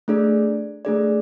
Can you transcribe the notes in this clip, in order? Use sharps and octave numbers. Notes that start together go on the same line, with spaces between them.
A3 D4 G#4 D5
A3 D4 G#4 D5